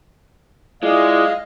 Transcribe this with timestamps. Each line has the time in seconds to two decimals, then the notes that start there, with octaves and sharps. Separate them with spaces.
0.83 G#3 E4 F4 D5 D#5 F5